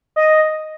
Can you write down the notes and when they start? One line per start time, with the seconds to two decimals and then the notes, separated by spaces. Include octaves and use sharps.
0.16 D#5